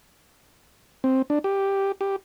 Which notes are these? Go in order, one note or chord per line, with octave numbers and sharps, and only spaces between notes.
C4
D4
G4
G4